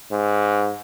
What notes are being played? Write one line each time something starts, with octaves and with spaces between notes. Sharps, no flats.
G#2